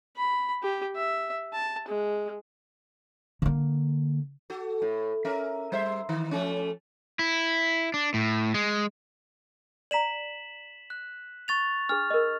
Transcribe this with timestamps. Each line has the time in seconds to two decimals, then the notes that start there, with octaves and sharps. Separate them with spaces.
0.17 B5
0.63 G4
0.96 E5
1.53 A5
1.88 G#3
3.42 D3 A#3
4.50 F#4 A4
4.82 A2
5.25 C#4 A#4 E5
5.72 G3 C5 E5
6.09 D#3
6.31 F3 A3 C#4
7.19 E4
7.94 D4
8.14 A2
8.54 G#3
9.91 D5 A#5 B6 E7 F#7
10.90 F#6
11.48 C#6 A6 F7
11.89 D4 G#4 F6
12.10 A#4 D#5